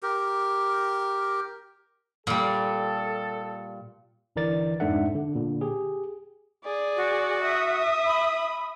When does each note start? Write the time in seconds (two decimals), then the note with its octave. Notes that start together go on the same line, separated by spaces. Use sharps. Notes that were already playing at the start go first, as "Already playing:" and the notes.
0.03 G4 A#4
2.27 A#2 G3 A4
4.36 G1 D3 E3 A#4 D5 A6
4.80 F2 G#2 D4 A4 E5 F#5
5.15 D3
5.35 A#2 D3
5.61 G4 G#4
6.64 G#4 D5
6.96 F#4
7.43 E5 D#6
8.06 B5